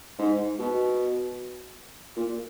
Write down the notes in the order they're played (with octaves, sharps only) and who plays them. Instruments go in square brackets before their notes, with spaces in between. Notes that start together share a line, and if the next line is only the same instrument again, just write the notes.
[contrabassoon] G#2
B2
A#2